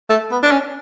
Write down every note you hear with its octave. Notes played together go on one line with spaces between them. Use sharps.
A3
B3
D4
C#4